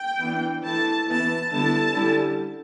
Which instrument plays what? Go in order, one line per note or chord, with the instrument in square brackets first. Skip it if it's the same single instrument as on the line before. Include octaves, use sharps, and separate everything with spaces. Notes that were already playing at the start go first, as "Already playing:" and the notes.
Already playing: [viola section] G5
E3 B3 D4
E3 A3 E4 A5
E3 B3 E4 A5
D3 G3 B3 E4 A5
D3 G3 C#4 E4